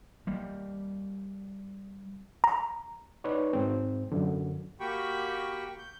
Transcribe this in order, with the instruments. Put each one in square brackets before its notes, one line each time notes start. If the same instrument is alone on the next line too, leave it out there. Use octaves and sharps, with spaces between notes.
[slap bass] G3 A#3
[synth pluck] A#5
[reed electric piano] D#4 B4 C#5 D5
G#2 C4
F#2 D3
[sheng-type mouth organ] A#3 F#4 G4 G5 B5 C#6
G6